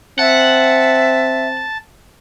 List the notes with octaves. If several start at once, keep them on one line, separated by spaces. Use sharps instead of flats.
C4 E5 F#5 A5